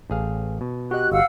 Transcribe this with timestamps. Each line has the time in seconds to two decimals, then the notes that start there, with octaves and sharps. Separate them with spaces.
0.10 A1 G#4 F5
0.61 B2
0.91 F#4 G4 D#5 F#6
1.12 G1 F5 F#5 E6